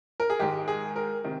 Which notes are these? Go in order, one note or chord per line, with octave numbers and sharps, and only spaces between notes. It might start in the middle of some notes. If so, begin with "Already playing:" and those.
A#4
G#4
G#2 D#3 G#3 G4
G#4
A#4
C3 D#3